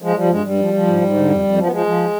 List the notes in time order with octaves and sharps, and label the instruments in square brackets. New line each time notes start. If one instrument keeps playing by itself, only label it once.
[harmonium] F3 G#3
F3 G3
G2 G#3
G2 G3
F3
F3
G#2
G#2
D3
F2
F2
F3
B3
F3 G#3
F3